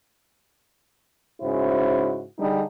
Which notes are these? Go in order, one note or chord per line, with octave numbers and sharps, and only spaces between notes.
G#2 C#3 E4 F#4 C5
D3 G3 D4 D#4 G#4